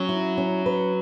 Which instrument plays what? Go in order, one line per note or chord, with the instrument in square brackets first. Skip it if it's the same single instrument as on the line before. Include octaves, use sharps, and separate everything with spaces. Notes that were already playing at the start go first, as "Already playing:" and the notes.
Already playing: [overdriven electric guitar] F#3 [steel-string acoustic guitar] C#4
[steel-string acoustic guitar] E4
C#4
B4